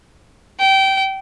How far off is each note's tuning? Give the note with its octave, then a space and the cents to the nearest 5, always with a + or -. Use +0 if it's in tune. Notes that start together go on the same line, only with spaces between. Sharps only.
G5 -20